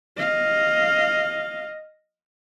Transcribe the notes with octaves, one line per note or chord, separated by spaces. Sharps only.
D#5 F5